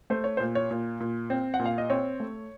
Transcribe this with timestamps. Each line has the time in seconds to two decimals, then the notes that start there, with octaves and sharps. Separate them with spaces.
0.10 A3 C5
0.24 C#5
0.37 C5
0.40 A#2
0.55 C#5
0.71 A#2
1.00 A#2
1.30 C4
1.54 F#5
1.59 A#2
1.65 F5
1.78 D#5
1.90 C4 C#5
2.20 A3